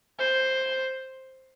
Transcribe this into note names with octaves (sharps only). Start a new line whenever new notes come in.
C5